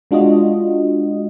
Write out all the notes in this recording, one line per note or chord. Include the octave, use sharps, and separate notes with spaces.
G#3 D4 F4 F#4 D#5